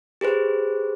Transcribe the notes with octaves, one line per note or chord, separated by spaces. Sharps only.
G4 G#4 B4 C5